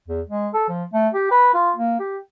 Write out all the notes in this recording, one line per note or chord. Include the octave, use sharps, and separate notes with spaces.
E2
G#3
A4
F3
A3
G4
B4
F4
A#3
G4